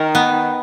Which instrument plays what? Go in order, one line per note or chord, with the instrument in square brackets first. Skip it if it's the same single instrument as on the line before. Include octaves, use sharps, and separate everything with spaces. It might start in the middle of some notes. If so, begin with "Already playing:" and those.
Already playing: [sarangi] D#3 [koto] A#4
[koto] B3